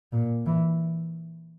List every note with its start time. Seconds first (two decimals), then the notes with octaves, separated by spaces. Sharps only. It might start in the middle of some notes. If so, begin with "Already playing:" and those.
0.12 A#2
0.46 E3